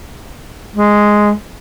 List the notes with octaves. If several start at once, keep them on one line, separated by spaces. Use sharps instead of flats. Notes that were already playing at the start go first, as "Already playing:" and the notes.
G#3